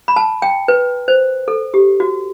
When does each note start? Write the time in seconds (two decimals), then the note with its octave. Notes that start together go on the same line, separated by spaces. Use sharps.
0.08 B5
0.16 A5
0.42 G5
0.68 B4
1.08 C5
1.48 A4
1.74 G4
2.00 F#4